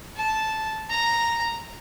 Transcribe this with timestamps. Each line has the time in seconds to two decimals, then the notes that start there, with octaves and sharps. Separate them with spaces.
0.16 A5
0.90 A#5